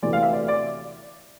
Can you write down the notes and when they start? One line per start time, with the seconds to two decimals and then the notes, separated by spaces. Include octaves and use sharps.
0.02 D2 C3 E3 D5
0.13 F5
0.23 E5
0.33 D5
0.48 D5